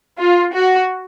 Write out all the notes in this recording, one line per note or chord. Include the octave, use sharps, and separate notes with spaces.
F4
F#4